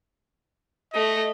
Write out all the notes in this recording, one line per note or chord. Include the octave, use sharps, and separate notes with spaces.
A3 D#5